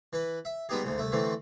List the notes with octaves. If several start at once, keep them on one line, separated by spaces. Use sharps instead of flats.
E3 B4
E5
G3 G#3 B3 D#4 G4 G#4
D2 G#2 C#3
C2 A3 E5
D3 E3 A3 C4